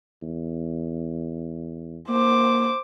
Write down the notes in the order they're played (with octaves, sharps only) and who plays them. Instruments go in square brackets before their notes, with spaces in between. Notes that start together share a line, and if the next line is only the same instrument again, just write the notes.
[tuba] E2
[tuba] A#3 [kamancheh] C5 D6